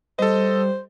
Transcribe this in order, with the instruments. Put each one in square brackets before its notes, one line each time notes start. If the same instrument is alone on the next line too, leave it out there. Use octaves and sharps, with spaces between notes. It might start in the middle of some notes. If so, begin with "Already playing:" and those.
[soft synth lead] G3 [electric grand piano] A4 D#5 [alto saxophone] C5